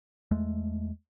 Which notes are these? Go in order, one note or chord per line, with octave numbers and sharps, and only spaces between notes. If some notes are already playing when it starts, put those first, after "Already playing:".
E2 G#3 A3